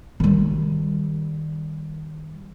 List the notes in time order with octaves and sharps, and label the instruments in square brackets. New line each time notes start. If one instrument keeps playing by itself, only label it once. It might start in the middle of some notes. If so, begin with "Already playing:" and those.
[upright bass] D#3 G3